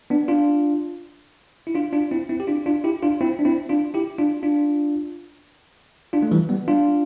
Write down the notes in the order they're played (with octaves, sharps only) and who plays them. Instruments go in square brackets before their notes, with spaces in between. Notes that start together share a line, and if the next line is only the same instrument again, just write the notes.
[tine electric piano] B3 D4
D4 F4
E4
D4 F4
D4 F4
C4 E4
C4 E4
G4
D4 F4
D4 F4
E4 G4
D4 F4
C4 E4
D4
C4 E4
D4 F4
E4 G4
D4 F4
D4 F4
D4 F4
A3
E3 G3
G3 B3
D4 F4